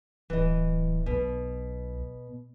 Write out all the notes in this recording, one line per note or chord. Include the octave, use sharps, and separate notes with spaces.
D1 E3 D#5
B1 B2